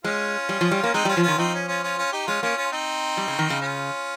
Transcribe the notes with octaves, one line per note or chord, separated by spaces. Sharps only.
G#3 C#4 F4
G3
F3
G3
A#3 C#4
G#3 C4 D#4
G3
C#4 F4
F3
D#3 C#4 F4
F3 C4 D#4
C#4
C#4 F4
C#4 F4
C#4 F4
D#4 G4
G#3 C#4 F4
A#3 C#4 F4
C#4 F4
C4 D#4
G3
C#3
D#3
C#3
C#4 F4